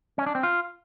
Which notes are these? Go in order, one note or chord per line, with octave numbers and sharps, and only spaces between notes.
C#4
D4
C4
F4